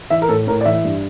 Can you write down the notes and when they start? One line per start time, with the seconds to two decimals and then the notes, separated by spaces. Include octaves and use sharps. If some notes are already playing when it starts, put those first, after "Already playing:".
0.10 E3 E5
0.22 A#4
0.28 A2 A4
0.47 A2 A#4
0.61 D5
0.65 E3 E5
0.84 G2